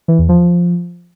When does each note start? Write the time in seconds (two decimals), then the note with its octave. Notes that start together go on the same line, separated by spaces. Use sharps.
0.08 E3
0.19 E2
0.29 F3